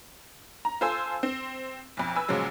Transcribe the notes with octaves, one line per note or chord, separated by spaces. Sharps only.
A#5
F4 A4 C5 G#5 E6
C4
B1 F2
B4 G#5 E6
A#2 C#3 F3 F#3 G#3